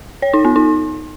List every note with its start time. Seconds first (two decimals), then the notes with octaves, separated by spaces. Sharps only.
0.22 C#5
0.34 D#4
0.45 B3
0.56 D#4